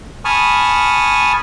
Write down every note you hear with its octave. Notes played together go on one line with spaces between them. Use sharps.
G#5 A5 B5 C#6 D#6 F6